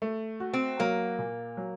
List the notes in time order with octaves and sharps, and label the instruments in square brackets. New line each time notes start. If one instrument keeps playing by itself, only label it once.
[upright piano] A3
F#4
[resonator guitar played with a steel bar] C4
[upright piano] F#3 [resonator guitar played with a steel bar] A#3
[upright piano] A#2
F#3